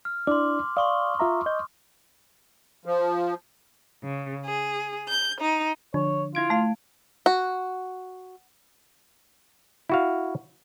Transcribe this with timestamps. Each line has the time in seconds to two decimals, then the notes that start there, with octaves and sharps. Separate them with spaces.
0.05 F6
0.27 D4 E4 D5 C6 D6
0.77 D5 F5 C6 C#6 D#6
1.19 F4 E5 A#5
1.46 D#5 G6
2.86 F3
4.03 C#3
4.44 G#4
5.07 G6
5.39 D#4
5.94 D3 F3 D4 C#5
6.35 E4 F4 G#6 D7
6.50 A3 F5
7.26 F#4
9.89 E4 F#4 F5